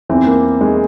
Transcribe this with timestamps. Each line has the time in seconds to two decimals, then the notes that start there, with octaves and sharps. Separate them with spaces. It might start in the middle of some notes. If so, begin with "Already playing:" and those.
0.09 E2 E3 C4
0.26 A#3
0.61 G#3